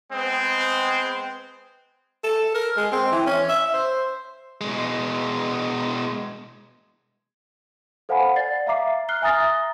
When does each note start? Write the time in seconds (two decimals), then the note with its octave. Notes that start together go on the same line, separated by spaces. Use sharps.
0.12 G#3 B3 C4
2.24 A4
2.54 A#4
2.77 G#3
2.92 C4
3.12 E3
3.26 C#4
3.49 E5
3.73 C5
4.61 B2 G#3
8.09 A4 C5 F5 F#5 G#5 B5
8.36 D5 A6 C7
8.67 E5 F5 A#5 D6 C7
9.09 F6 F#6 C7 G7
9.22 E5 G#5 A#5 D#6 A6 A#6